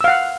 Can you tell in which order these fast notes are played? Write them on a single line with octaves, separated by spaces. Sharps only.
E6 F5 F#5